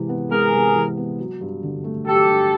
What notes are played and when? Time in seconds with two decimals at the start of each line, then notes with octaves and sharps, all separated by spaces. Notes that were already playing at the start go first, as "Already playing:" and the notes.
Already playing: C3 E3 G#3
0.09 B3
0.31 G#3 G#4 A#4
0.53 C3
0.75 E3
0.97 B3
1.19 F#3
1.41 G2
1.63 D3
1.84 A3
2.06 F#3 G4 A4
2.28 G2